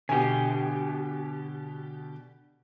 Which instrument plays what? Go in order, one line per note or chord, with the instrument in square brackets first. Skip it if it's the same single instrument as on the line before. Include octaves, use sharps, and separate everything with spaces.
[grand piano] B2 G#5 [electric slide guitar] D3 G4